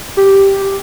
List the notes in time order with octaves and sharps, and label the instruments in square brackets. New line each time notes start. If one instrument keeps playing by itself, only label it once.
[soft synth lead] G4